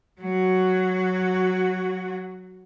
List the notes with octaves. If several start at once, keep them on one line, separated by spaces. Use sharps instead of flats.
F#3 F#4